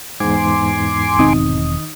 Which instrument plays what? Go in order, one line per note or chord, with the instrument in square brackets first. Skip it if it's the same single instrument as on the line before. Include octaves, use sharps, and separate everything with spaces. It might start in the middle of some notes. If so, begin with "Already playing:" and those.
[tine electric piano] E2 G#2 [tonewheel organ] G#5 C6 D6
[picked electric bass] E1 C4 [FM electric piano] D#3 D#4 D#6